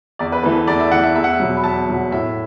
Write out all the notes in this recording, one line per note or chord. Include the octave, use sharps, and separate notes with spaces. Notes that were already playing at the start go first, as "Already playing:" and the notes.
E2 D5
B4
E3 A3 B4
B4
E2 D5
E5
E3 A3 F#5
E5
E2 E5
F#5
E5
B2 F#3
B5
E2 A5
B2 F#3
A2 E5